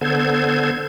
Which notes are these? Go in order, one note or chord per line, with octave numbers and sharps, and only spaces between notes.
D3 B3 A4 C5 G#6